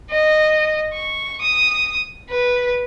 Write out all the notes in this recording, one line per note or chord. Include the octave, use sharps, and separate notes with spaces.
D#5
C#6
D#6
B4